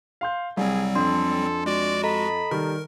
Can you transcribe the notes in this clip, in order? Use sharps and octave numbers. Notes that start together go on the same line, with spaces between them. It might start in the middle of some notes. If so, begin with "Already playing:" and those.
F5 C6 G6
C2 F#3 G3 C4 G#4
F2 D4 A4 C6
G#3 F#4 D5
A4 D#5 A#5 B5
D#3 G3 A#4